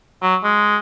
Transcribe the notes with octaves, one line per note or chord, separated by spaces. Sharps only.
F#3
G#3